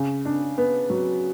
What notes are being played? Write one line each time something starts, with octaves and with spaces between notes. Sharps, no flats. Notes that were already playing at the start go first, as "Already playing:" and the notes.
Already playing: C#3
D4
B3
F#3